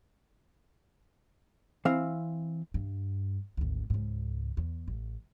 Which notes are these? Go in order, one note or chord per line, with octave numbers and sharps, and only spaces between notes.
E3 C4 F5
G2
G#1 D2
C#2 G#2
E2
A1